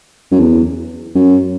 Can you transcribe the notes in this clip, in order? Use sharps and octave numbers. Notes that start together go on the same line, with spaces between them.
F#2
E2
F#2